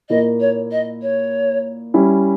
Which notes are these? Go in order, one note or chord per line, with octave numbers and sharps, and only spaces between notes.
A#2 A#3 E4 A#4 D#5
C#5
D#5
C#5
G3 C#4 E4